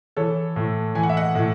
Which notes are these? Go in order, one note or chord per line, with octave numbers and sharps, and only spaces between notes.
E3 A4 C#5
A2
E3 G#5
F#5
E5
D#5 F#5
A2